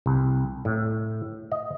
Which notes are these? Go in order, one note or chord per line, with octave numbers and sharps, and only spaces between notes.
C2
A2
D#5